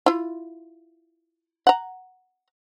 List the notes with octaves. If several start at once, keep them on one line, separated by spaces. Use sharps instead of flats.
E4 F4
F#5 A#5